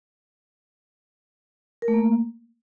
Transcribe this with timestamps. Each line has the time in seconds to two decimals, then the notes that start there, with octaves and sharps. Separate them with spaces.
1.82 A#4
1.88 A3
1.94 A#3